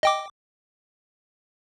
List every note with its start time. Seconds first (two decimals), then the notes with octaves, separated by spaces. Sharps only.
0.03 D#5 G5 D6